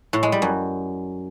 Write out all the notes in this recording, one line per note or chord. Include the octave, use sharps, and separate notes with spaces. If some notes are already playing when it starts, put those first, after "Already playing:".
A2
G#3
G3
F#2